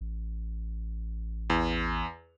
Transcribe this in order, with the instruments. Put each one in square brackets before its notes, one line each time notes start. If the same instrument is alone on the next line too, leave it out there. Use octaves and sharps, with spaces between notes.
[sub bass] A1
[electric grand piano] E2